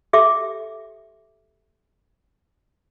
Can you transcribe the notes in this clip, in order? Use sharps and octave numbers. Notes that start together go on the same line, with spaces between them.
G4 A4 E5 D6